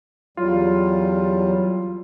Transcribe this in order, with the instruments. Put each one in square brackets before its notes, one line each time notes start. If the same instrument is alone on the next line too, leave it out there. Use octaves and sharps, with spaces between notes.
[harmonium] E2 G3 [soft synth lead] F#3 [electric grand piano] F4